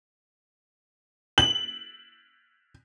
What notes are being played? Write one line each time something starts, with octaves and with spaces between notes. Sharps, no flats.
F#7